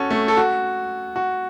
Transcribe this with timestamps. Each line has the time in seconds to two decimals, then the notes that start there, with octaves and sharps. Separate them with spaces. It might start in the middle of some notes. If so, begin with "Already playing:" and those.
Already playing: C#4 F#4 A4
0.11 A3
0.28 A4
0.37 F#4
1.16 F#4